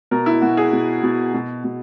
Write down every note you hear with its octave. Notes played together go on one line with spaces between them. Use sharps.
B2 A#4
E4
B2 F#4
G#4
B2
B2
B2
B2